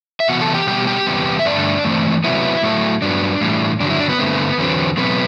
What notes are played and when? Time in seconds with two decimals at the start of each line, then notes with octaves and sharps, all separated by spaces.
0.20 E5
0.29 C3 E3 B3 F#4 F#5
0.41 A4 A5
0.54 G4 G5
0.67 B2 G3 B3 G4 G5
0.87 G4 G5
1.06 E2 C3 G3 B3
1.39 E5
1.45 G2 D3 A3 D4 D5
1.84 G2 E3 A3 C4
2.24 C3 F#3 B3 E4
2.63 A2 F#3 A3
3.02 G2 F#3 B3 D4
3.41 A2 E3 G3
3.80 G2 D3 F#3 D4
3.90 E4
4.00 D4 D5
4.09 B3 B4
4.19 G2 D3 A3 C4
4.58 E2 D3 F#3 C4
4.97 B2 F#3 A3 B3 C4 B4